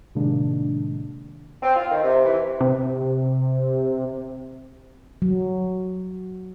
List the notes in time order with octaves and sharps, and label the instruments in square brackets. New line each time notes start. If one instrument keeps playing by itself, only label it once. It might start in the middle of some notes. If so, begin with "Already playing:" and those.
[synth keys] A2 C3 D#3 G#3 A#3 D4
[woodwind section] C4
F4
D#3
C3
E3
[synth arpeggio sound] C3
[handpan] F#3